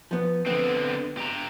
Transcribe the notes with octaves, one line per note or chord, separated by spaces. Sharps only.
F3 B3
D3 B3 C4
G4 A#5